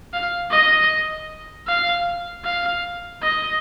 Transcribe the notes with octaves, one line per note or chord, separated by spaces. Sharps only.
F5
D#5
F5
F5
D#5